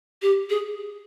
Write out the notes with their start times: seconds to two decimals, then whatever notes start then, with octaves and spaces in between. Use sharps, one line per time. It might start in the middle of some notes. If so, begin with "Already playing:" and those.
0.22 G4
0.50 G#4